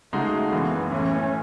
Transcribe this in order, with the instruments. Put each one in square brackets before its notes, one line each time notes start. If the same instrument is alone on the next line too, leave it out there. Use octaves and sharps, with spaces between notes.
[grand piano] C#3 G#3 D#4 F#4 [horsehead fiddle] A3
[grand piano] F#1 F#2 E3 [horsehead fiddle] B3
[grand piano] A2 E3 A3 [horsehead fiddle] C#4